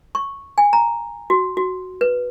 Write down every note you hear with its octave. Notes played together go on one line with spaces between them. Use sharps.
C#6
G#5
A#5
F#4
F#4
B4